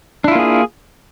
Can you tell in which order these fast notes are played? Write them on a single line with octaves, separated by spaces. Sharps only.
D4 E4 F4 A#3 G#4